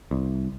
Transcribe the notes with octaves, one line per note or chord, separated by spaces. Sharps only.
C2